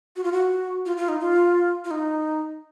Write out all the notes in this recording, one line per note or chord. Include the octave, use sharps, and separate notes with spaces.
F#4
F4
F#4
F4
F4
D#4
F4
F4
D#4